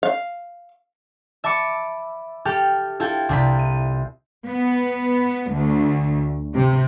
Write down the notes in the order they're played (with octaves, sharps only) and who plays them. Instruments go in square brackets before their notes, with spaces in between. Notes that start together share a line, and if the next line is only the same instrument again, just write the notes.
[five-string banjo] F5
[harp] E5 A5 B5 D6 C#7
G4 A4 G5 F6
E4 F4 A4 G5
C2 C3 B6
D#7
[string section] B3
D2
C3